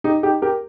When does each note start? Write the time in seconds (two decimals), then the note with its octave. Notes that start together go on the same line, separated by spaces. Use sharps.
0.04 D#4 G4
0.23 D#4 G4
0.42 G4 A#4